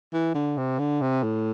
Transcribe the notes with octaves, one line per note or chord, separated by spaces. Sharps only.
E3
D3
C3
D3
C3
A2